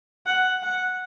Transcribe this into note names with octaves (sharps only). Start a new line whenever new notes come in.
F#5
F#5